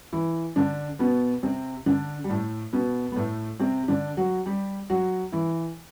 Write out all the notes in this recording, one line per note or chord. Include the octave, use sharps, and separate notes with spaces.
E3 E4
D3 D4
B2 B3
C3 C4
D3 D4
G3
A2 A3
B2 B3
B3
A2 A3
C3 C4
D3 D4
F#3 F#4
G3 G4
F#3 F#4
E3 E4